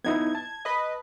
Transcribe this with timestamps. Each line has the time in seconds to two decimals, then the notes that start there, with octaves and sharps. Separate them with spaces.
0.04 B3 D#4 E4 G#6
0.35 A5
0.65 B4 D#5